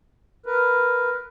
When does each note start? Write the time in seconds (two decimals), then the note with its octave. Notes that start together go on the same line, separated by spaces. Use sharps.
0.46 A#4 B4